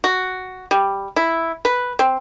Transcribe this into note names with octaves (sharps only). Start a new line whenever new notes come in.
F#4
G3
E4
B4
C4